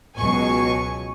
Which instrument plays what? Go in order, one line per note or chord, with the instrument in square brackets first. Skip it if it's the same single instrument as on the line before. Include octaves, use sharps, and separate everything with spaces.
[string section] C#2 B2 F#3 G#5 C#6